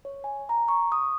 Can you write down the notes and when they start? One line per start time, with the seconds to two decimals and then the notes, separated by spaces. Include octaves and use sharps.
0.05 C#5
0.24 G#5
0.49 A#5
0.68 C#6
0.92 D#6